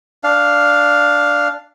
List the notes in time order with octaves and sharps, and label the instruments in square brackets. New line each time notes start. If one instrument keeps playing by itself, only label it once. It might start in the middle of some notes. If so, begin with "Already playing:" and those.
[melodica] D4 F5